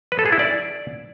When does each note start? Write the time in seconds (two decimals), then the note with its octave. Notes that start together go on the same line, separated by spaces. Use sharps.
0.12 B4
0.19 A4
0.26 G#4
0.32 E4
0.39 D5